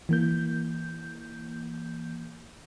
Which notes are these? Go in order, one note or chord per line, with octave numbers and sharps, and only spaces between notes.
E3 A#3 G6